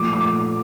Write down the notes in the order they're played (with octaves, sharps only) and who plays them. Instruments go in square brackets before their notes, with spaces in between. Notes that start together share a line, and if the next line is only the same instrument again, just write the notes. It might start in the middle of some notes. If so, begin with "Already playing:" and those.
Already playing: [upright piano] A#2 F3 A3 D6
D6